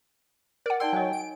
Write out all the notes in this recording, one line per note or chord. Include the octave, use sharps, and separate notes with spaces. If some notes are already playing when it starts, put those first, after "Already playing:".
A#4 D5 F#5
D#4 D5 G5 C6 E6
F#3 D#5 G#5
D7